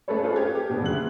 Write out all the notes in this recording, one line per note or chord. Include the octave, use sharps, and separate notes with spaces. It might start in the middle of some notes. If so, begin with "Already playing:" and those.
A3 C#4 G#4 A4 B4 C#5
D4 F4 G#4 A4 B4 C5
G4 G#6
G4
B2 D4
D2 C#3 F#3 F#6 F#7